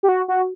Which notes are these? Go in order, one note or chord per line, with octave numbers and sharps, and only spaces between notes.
G4
F#4
F#4